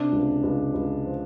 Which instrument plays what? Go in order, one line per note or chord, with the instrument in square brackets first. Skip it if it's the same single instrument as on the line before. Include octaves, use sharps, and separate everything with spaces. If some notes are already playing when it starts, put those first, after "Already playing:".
Already playing: [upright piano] C3 D4
C#2
C#2
C#2
F3